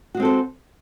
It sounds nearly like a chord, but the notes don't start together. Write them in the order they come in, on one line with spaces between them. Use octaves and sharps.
F#4 G#3 C4 A4 C5